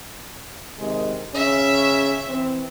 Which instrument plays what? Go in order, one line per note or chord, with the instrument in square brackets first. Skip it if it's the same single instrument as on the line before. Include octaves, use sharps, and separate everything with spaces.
[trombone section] C3 D#3 G#3
[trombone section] C#3 C#4 [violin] E5
[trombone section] E3 C4